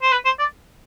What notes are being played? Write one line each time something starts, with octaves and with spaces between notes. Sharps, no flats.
C5
B4
C5
D5